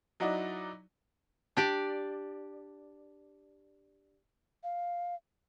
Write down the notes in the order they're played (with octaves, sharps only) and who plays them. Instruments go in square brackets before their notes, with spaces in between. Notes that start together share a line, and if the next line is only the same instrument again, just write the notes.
[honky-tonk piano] F#3 D#4 E4 F#4 D5 D#5
[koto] D4 G4 D5
[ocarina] F5